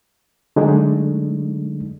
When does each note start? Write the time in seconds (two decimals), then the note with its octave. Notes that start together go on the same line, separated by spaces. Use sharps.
0.56 D3 F#3 G#3 A3 D4 D#4